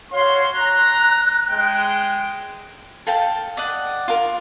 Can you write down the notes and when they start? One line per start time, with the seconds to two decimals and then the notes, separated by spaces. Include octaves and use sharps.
0.12 F#4 C#5 F5 C6
0.54 A#5 F#6
1.50 G#3 G5
3.07 A4 F5 G5 A5
3.57 D5 D#5 F#5
4.08 F4 A#4